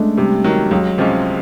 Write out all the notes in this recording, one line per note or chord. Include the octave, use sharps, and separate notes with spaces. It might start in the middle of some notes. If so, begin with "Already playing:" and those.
Already playing: G#3 A3 D4
C3 G3
D#3 F#3
C#2 F#3
C3 F3 G#3 C#4